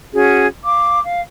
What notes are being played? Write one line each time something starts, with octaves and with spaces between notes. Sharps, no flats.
C#4 F#4 G#4
F5 D6
F5